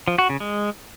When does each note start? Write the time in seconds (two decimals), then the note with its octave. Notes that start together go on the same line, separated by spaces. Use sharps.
0.08 F3
0.18 F#4
0.29 C#3
0.40 G#3